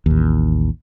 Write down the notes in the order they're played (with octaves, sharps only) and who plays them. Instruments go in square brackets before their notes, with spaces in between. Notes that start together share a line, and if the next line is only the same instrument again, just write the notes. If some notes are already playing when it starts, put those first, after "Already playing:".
[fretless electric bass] A1 D#2